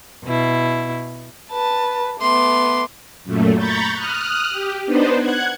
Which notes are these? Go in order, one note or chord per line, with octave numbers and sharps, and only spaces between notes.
B2 E4
B4 A5
A3 B3 C6 D6
F#2 A#2 A3
A#5 B5 C#6 G6 A6
D#6 F6 F#6
G4
B3 D4 D#4 B4 C5
F#5 F#6 G#6